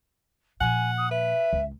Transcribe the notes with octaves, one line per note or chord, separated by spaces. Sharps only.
A#2 F3 F#5 G#5
D#6
B4 E5
C#2